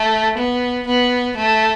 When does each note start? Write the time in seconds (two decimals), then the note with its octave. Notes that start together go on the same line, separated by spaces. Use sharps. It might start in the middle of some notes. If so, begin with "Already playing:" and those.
Already playing: A3
0.37 B3
0.87 B3
1.36 A3